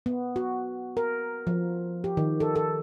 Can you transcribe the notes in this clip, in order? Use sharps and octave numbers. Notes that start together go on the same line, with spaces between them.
B3
F#4
A#4
F3
G4
D#3
A4
A4